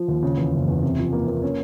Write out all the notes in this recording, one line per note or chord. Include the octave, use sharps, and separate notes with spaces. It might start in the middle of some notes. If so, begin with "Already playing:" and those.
Already playing: F3
D#2
C#3
E2
F#1
E2
C3
F3
A#3
A#3
C#4